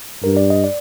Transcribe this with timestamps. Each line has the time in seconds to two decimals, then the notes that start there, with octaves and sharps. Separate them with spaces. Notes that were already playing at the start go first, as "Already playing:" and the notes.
0.24 G2 A#4
0.37 D5
0.50 D#5
0.64 D5